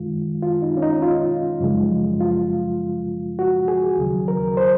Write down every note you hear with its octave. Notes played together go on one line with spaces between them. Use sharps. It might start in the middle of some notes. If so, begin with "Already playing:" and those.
Already playing: F#2 D#3 G#3 F4
F4
D#4
C#4
D#4
F4
F#2 C#3 F3 G#3
F4
F#4
G#4
D#2 C#3 F#3
A#4
C5